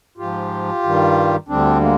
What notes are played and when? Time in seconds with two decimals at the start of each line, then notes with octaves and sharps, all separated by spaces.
0.18 G#2 F3 F4 G4
0.83 G2 D#3 G3
1.48 D2 D3 G3 C4 D4
1.81 G#3 A#3